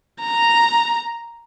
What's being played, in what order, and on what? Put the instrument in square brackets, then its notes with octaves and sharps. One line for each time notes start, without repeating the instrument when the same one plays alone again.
[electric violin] A#5